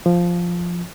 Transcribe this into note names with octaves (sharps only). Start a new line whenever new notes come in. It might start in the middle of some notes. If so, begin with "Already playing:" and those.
F3